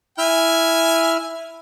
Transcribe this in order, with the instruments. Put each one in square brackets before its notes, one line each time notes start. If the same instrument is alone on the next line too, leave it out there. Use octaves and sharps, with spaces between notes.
[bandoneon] E4 F6 [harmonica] G#5